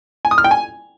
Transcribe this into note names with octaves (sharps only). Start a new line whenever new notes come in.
G#5
D#6
F6
G5
G#5